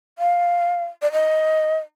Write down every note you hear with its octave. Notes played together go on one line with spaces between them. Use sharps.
F5
D5
D#5